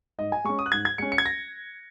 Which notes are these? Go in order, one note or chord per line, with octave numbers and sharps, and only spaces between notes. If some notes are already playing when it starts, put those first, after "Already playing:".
G#2 D#5
G#5
G#3 C#4 C#6
D#6
F#6
G#2 G#6
G#6
G#3 C#4 C#7
C#7
G#6
A#6